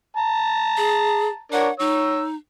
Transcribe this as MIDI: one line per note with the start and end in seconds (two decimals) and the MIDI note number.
0.16 1.41 81
0.16 1.41 82
0.77 1.29 68
1.52 1.68 62
1.52 1.68 70
1.52 1.68 73
1.52 1.74 78
1.79 2.35 63
1.79 2.24 73
1.79 2.24 88